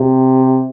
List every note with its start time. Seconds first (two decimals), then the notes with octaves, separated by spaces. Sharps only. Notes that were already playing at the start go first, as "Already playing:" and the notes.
Already playing: C3